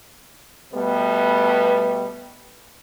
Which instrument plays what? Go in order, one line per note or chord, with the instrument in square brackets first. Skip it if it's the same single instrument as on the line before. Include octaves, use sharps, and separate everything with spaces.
[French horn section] B2 G3 A3 B3